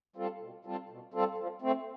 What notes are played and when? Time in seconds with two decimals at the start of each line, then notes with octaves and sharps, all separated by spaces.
0.16 G3 C4 F4 A4
0.41 B2
0.65 G3 C4 F4 A4
0.89 B2
1.14 G3 C4 F4 A4
1.38 F3
1.62 A3 C4